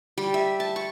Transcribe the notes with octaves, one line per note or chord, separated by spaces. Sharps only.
G3
E5
A5
C#6